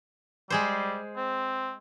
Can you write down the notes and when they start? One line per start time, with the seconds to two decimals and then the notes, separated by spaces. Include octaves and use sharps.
0.50 G3 G#3 G#4 C5
1.16 C4